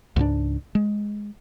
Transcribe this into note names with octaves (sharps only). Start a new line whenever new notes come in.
C#2 G#2 G3 D4
G#3